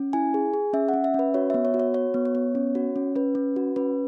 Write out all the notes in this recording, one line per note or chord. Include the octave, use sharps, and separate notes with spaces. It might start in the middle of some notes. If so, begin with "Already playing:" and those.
Already playing: C#4
E4 G#5
G#4
G#4
C#4 E5
F#5
C#4
E5
C#4 B4
F#4 C#5
B3 E5
C#5
F#4
C#5
F#4 C#5
B3
C#5
B3
C#4
F#4
C#4
C#4 B4
C#4
F#4
C#4 B4